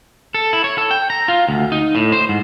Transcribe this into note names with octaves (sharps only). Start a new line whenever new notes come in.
A4
E4
C#5
A4
G5
A#5
F4
D2
D#4
A2
C5
G#2